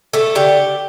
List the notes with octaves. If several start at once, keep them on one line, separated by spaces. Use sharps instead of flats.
A3 A4
D3 G4